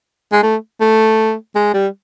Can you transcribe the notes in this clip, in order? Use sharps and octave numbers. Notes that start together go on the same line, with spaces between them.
G#3
A3
A3
G#3
G3